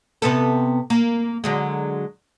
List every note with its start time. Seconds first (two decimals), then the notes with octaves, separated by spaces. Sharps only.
0.22 C3 B3 A4
0.90 A#3
1.44 D3 F#3 G#3